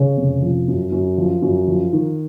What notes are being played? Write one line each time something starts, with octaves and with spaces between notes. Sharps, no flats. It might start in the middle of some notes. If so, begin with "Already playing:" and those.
Already playing: C#3
F1
F3
F#2
F#2
F3
F#2
F3
D#3